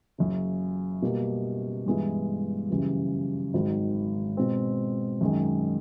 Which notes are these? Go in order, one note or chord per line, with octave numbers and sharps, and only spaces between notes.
F#1 F#2 C#3
B2 G3 A#3
G2 E3 G#3 B3 E4
F#1 F#2 C#3 E3 G3
G#1 G#2 D#3 F#3
B2 G#3 C4
F#2 D#3 G#3